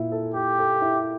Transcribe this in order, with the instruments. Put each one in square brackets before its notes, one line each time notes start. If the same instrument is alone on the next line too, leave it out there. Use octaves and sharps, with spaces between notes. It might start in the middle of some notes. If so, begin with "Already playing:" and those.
Already playing: [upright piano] A#2 E4
A4
[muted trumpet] G4 [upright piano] A4
[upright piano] A4
E4